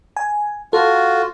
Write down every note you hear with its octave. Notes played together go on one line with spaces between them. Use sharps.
G#5
F4 F#4 A4